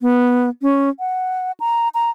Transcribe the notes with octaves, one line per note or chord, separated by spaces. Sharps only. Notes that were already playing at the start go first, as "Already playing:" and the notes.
B3
C#4
F#5
A#5
A#5